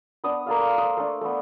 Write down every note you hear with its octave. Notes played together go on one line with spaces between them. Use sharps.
B3 D4 D#6
A#3 A4 F5
C6
C5 D#6
A3 D4
A3 B3